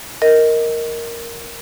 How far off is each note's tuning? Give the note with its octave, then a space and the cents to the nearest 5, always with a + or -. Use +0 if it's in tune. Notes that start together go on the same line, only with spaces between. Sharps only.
A#4 +0 D#5 +15